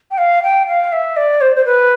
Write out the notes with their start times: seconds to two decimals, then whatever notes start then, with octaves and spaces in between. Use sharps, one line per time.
0.11 G5
0.18 F5
0.43 G5
0.67 F5
0.92 E5
1.17 D5
1.41 C5
1.56 C5
1.65 B4